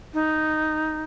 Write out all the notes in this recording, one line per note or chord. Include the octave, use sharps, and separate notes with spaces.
D#4